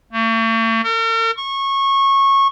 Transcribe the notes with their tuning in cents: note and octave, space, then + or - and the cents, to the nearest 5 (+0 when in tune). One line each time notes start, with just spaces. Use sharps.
A3 +45
A#4 -45
C#6 -20